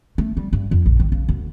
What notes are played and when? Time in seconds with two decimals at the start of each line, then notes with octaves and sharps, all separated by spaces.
0.18 A3
0.37 G3
0.53 G2
0.71 F2
0.86 A#1
1.00 D#3
1.12 C#3
1.29 D2